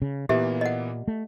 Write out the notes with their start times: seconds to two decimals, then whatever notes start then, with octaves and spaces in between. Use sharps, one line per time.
0.02 C#3
0.29 A#2 E3 A#3 B3 G4 E5
0.61 D#5 F#5
1.08 A3